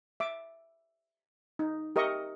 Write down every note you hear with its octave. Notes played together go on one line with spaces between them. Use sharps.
E5 D6
D#4
G4 A#4 D#5 E5 C#6